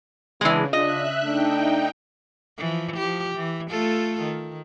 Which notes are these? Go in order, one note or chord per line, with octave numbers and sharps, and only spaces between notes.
C#3 E3 G#3 B3 D4
D4 F4 D#5 E5 F#6
A3 D4 D#4 G5
E3 F3
F3 G4
E3
A3 F4 A4
D#3